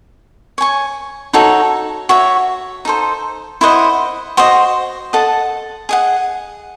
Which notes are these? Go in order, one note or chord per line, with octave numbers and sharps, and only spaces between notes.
C#5 G#5 C#6
D#4 F#4 A4 C#5
F#4 C#5 E5
D#4 A4 C5
E4 C5 D#5 F#5
F#4 C5 D#5
A4 D#5 F#5 A5
G#4 D#5 F#5